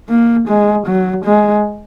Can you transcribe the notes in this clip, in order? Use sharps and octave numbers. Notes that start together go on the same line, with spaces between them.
A#3
G#3
F#3
G#3